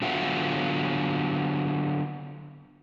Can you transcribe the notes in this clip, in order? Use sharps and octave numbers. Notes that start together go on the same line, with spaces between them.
D3 F#3 B3 F4 E5 F#5